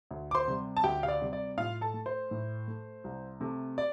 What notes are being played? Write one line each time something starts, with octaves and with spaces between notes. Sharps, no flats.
D2
D6
C5 C6
C3 G3
A5
D2 G4 G5
F5
D5
C3 G3
D5
A2 F4 F5
A4 A5
A3
C5
A2
A3
C2
C3 A3
D5